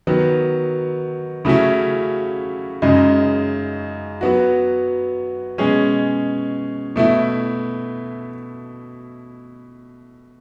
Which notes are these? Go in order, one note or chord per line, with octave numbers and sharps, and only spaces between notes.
D#3 F#3 B3
C#3 F#3 A3 C#4 E4
F#2 C#3 G#3 D#4
F#3 B3 F#4
B2 G#3 C#4 G#4
B2 A3 E4